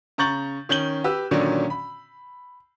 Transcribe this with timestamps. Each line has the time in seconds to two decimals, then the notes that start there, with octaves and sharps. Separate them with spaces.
0.18 C#3 A#5 C#6 G6 A6 F#7
0.69 D#3 C#4 G6 F#7 G7
1.04 G4 B4 E6
1.31 A#2 D3 D#3 F#3 C#4 D4
1.70 B5